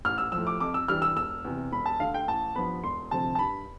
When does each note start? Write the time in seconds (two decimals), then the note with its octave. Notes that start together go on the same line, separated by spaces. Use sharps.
0.05 A1 F6
0.18 E6
0.32 F3 E6
0.38 A2
0.47 D6
0.60 F2 D6
0.74 E6
0.88 E3 G3 D4 F6
1.02 E6
1.16 E1 E6
1.45 E2 C3
1.72 E1 B5
1.86 A5
2.00 D2 D3 F5
2.14 G5
2.28 A1 A5
2.56 G2 F3 B3 B5
2.84 E1 C6
3.11 D2 C3 F3 C4 A5
3.35 A5
3.39 G2 B5